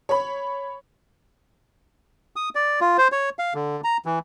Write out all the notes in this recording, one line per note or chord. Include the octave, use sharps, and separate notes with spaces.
C#5 B5
D#6
D5
F4
C5
C#5
F5
D3
A#5
E3